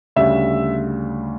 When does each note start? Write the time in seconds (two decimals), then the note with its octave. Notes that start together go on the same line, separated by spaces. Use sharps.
0.16 D2 C#3 G3 E5